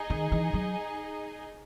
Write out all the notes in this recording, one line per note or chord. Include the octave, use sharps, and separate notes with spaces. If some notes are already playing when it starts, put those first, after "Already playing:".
Already playing: D#4 G#4 D#5
D#3
E3
F#3